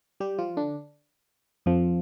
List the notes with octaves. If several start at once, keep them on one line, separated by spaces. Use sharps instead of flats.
G3 G4
F3 F4
D3 D4
F2 F3